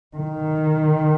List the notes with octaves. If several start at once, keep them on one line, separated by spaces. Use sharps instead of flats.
D#3